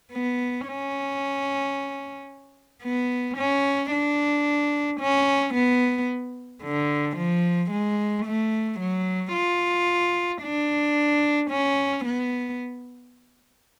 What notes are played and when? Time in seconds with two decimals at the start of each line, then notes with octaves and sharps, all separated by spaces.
0.12 B3
0.67 C#4
2.83 B3
3.37 C#4
3.92 D4
5.00 C#4
5.54 B3
6.63 D3
7.17 F3
7.70 G#3
8.25 A3
8.79 F#3
9.33 F4
10.42 D4
11.50 C#4
12.04 B3